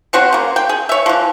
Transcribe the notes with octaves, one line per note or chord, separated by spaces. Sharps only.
C4 C#4 F#4 C5
C#3 A#3
G5
G#4
C#5 E5
E3 F3